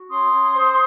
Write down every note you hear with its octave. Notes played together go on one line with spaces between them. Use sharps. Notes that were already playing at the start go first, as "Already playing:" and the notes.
Already playing: F#4
C#4 C6 D#6
C#4
C5